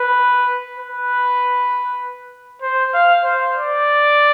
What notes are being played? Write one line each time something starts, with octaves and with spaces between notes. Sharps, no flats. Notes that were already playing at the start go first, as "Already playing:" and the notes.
Already playing: B4
B4
C5
F5
C5
D5